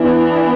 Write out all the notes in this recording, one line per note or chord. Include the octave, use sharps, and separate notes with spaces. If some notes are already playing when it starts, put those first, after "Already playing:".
Already playing: E3 B3 D4